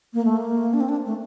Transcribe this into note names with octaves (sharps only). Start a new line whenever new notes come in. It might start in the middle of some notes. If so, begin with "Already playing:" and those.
A#3
A3
A#3
D4
C4
D4
A3